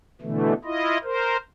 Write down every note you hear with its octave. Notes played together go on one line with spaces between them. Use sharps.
B2 D3 E3 A3
E4 F4 D#5
A#4 C5